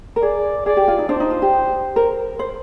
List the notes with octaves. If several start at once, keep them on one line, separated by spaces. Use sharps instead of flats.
A#4
G#4 D5
G#4 D5
G4
F4
D#4
D4 C5
D#4
F4
G4
A#4 C5
C5